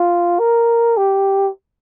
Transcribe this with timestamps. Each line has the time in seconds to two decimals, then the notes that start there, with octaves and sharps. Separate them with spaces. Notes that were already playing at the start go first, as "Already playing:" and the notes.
Already playing: F4
0.39 A#4
0.97 G4